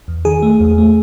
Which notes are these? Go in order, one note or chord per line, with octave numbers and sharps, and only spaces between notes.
E2
D#3 G#4
A3
E2
A3